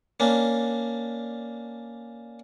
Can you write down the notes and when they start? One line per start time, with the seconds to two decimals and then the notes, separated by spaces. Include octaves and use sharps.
0.20 A#3 C#4 D4